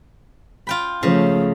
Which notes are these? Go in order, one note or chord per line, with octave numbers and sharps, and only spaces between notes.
F4 G5 B5
C#3 F3 A3